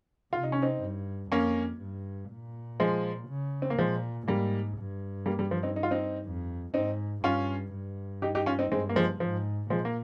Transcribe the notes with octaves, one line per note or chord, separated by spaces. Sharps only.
C3 F4
D#4
C#4
C4 D#4
G2
F2 A#3 C#4
G2
A#2
F3 G#3
C#3
C4
A#3
A#2 F3 G#3
G#2 G3 A#3
G2
G3 A#3
G3
F3
C4 D#4
D#4
F4
C4 D#4
F2
G#2 C4 D#4
G2 C#4 F4
G2
D#4 G4
D#4 G4
C#4 F4
C4 D#4
G2 G#3 C4
A#3
F3 G#3
G#2 F3
A#2 F3 G#3
A#3